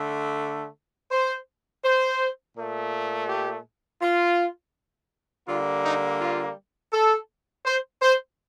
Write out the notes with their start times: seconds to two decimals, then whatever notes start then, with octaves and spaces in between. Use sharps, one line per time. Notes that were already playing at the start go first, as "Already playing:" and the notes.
Already playing: D3 A3
1.11 C5
1.84 C5
2.57 A#2 A3
3.29 G4
4.02 F4
5.47 D3 G3 A#3 F4
5.84 D#4
6.20 F4
6.93 A4
7.66 C5
8.02 C5